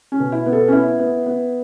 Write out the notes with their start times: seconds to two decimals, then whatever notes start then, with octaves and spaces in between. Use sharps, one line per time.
0.12 C#4
0.20 B2
0.32 E4
0.46 B3
0.53 A4
0.68 C#4
0.72 B3 E4
1.00 B3
1.26 B3